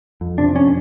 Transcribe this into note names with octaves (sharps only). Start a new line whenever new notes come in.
F2
C3 D4
F2 C#4